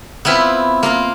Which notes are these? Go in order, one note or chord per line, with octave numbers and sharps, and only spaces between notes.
B3 C4 E4 F4 B4
A#3 F4 A#4